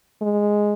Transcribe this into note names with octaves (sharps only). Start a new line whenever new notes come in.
G#3